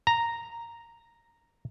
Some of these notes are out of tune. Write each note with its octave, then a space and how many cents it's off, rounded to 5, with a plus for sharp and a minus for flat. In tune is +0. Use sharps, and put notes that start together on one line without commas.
A#5 -5